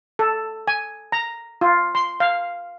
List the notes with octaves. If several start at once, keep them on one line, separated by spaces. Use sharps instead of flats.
A4
G#5
A#5
F4
C6
F5